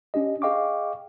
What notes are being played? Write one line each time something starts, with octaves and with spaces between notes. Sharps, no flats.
C#4 D4 G4 D#5
G#4 D#5 F5 G5 C#6 D6